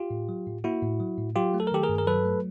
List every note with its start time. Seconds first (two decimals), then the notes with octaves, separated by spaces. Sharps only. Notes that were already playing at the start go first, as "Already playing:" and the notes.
Already playing: F4 G4
0.10 A2
0.29 F#3
0.47 A2
0.64 A#3 E4 F#4
0.82 A2
1.00 F#3
1.18 A2
1.36 F#3 F4 G4
1.54 A3
1.60 A4
1.67 A#4
1.72 D#3 G4 A4
1.83 G#4 A#4
1.89 G2
1.98 A#4
2.07 F#3 A4 B4
2.25 A3